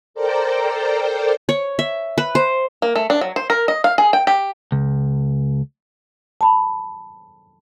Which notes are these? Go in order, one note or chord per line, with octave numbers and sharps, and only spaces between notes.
A4 A#4 C5 D5 G5 A#5
C#5
E5
B4
C5
A#3
A3
D4
F#3
C5
A#4
D#5
F5
G#4
G5
G4
C#2
A5 B5